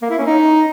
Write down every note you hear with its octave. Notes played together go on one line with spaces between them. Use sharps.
A#3
E4
C#4
D#4